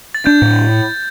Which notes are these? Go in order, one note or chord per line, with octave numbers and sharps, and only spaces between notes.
A6
D4 G6
A2